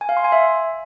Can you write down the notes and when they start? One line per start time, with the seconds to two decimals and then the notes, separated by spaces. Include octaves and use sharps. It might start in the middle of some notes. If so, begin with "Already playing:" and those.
0.01 G#5
0.09 F5
0.17 C6
0.24 G#5
0.32 E5